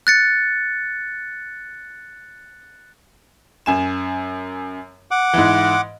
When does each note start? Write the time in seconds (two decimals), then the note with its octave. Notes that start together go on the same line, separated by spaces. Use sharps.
0.07 F#6 A6 C#7
3.66 F#2 G#5 E7
5.11 F#5 D6
5.33 G#2 E3